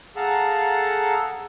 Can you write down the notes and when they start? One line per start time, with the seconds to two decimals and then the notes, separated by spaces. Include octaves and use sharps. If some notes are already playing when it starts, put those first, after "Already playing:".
0.16 G#4 A4 F5 F#5 A5 A#5